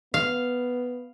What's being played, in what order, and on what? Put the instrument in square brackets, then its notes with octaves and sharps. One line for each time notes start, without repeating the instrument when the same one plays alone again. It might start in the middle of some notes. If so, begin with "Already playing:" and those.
[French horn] B3 [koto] F5